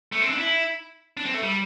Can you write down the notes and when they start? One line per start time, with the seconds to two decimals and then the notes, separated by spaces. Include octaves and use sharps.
0.12 A3
0.21 C4
0.30 D4
0.38 E4
1.17 D4
1.26 C4
1.34 A3
1.43 G3